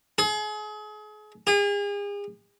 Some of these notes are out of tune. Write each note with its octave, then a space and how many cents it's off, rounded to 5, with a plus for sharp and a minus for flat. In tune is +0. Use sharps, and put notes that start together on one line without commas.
G#4 +35
G#4 -40